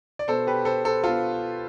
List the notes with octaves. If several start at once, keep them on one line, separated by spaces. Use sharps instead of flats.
D5
B2 B3 A4 C5
G4 B4
A4 C5
A4 C5
B2 B3 F4 A4